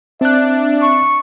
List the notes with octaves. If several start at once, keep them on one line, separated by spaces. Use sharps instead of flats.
C4 D4 E5 F#6
C#6